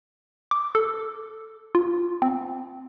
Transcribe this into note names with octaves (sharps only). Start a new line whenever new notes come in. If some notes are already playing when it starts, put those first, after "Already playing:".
D6
A4
F4
C4